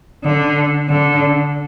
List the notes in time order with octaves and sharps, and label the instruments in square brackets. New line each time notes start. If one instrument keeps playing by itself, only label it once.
[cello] D3
D3